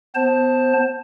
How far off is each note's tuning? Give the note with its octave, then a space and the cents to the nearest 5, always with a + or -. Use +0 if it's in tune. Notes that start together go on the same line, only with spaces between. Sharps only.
B3 +25 C5 +15 A5 +0